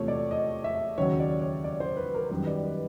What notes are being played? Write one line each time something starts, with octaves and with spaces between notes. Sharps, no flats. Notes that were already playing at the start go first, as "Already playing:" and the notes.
Already playing: E2 C3 F3 A3 C#5
D5
D#5
E5
D#2 C#3 F#3 C#5
D5
C#5
D5
C5
B4
A#4
F#2 D#3 G3 B4
D5
B4